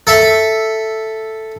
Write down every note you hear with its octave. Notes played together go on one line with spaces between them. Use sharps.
A4 E5